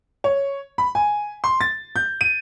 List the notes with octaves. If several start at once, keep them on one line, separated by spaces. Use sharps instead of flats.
C#5
B5
G#5
C6
A6
G6
D#7